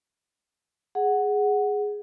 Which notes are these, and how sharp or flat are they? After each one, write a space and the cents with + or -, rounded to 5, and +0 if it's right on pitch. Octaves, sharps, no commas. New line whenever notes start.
G#4 +0 F#5 +0